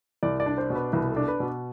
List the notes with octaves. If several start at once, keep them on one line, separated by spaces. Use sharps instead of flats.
C2 D5
D5
D4
C5
B2
B4
C2 B4
A4
D4
B4
B2